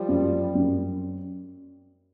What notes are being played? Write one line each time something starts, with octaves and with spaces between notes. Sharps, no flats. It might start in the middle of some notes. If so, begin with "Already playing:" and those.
Already playing: F3 G3
F#2
F#2